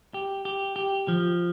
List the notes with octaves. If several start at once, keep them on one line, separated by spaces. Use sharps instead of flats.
G4
G4
G4
F3